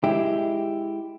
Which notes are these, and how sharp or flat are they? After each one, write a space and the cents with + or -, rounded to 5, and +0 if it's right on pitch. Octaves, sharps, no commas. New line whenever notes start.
G#3 +0 E4 +0 G4 +0